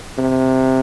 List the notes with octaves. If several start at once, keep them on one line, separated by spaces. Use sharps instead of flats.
C3